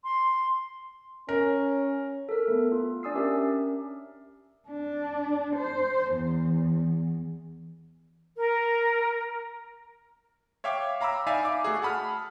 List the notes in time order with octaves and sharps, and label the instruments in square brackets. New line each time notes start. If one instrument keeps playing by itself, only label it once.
[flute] C6
[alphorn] C#4 [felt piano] A#4
[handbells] A4 A#4
A3 B3
F4
D4 D5 G#5 D#6 E6 C7
C#4 G4 A#4 E5
[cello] D4
C5
E2
[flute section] A#4
[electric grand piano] C#5 E5 F5 G5 D6
F5 A#5 B5 D6 E6
D#4 D5 E5 F5 G#5 B5
D6
A3 F#4 G#4
F#5 A5 B5 D#6 F6